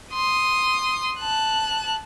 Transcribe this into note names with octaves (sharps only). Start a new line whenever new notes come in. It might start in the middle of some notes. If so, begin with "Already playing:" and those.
C6 D#6
A5 F#6